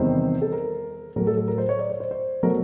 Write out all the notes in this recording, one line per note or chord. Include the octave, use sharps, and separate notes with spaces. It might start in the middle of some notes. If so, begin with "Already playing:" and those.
Already playing: E2 C3 D#3 G3 C5
A4
A#4
A2 F#3 A3 A#4
A4
A4
A#4
C5
C#5
D5
C#5
C5
C5
B2 F#3 A3 A#4